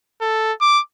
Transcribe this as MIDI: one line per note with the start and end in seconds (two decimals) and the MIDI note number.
0.22 0.53 69
0.61 0.80 86